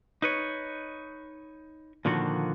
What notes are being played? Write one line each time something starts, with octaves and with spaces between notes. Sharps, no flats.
D#4 B4 C#5
A#2 D3 D#3 F3 F#4